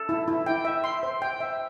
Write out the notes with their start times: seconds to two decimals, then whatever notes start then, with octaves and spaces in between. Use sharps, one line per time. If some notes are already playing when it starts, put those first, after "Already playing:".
Already playing: A4
0.09 E4
0.28 E4
0.46 G5
0.65 E5
0.84 C6
1.03 C5
1.22 G5
1.40 E5